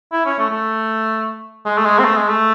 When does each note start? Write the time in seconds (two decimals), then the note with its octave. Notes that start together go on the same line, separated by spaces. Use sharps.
0.12 E4
0.25 C#4
0.39 A3
0.50 A3
1.65 G#3
1.77 A3
1.85 G#3
1.99 C4
2.04 A3
2.17 G#3
2.29 A3